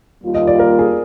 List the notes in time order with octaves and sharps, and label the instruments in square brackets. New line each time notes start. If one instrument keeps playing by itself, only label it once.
[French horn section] D#2 D#3 G3 A#3 F4
[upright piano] D#5
D5
A#4
G#4